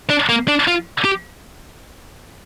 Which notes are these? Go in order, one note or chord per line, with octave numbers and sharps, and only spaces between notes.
D4
A#3
D4
F4
G4